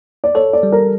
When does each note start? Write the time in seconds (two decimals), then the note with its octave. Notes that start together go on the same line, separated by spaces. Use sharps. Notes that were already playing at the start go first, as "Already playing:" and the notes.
0.24 D5
0.35 A4 C#5
0.53 D5
0.63 G3
0.72 A#4